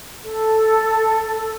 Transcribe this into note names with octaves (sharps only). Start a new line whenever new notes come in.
A4